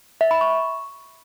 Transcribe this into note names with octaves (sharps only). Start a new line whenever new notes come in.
E5
B5
C#6